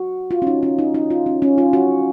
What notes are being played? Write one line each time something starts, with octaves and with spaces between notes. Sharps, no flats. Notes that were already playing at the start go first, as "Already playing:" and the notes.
Already playing: F#4
F4
C#4
D#4
C#4
D#4
D#4
F4
C#4
C#4
F4
F#4